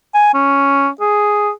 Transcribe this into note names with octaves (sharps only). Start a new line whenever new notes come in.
G#5
C#4
G#4